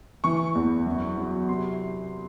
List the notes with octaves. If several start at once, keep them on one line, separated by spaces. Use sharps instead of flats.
E3 C#6
E2
F#2
F#3
C3 C6